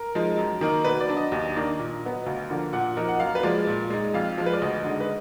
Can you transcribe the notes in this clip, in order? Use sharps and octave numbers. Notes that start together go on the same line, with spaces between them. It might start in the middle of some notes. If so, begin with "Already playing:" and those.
Already playing: A#4
F3 G#3 D#4
F#2
D#3 A#3 D#4
B2 B4
D5
F#3 D4
D#5
D#2
D#3 A#3 D4
A#2
F#3 B3
D2 F5
D3 F3 A#3
A#2 F#5
F3 A#3 D#4
F#5
F#2 F5
B4
F3 G#3 D5
A#2
G#3 D#4
F2 F5
F3 G#3
B4
D5
D2 D#5
D3 G#3 D#4
B4